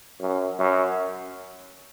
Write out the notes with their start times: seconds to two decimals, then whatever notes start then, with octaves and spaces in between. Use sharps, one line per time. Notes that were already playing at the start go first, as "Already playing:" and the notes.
0.20 F#2
0.59 F#2